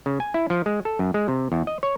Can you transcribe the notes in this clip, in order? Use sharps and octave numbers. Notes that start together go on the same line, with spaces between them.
C#3
G#5
E4
F3
G#3
A4
F#2
G#3
C3
E2
D#5
C#5